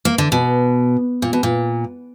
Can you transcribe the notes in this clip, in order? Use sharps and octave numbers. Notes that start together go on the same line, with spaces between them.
A#3
D3
B2
A#2
B2
A#2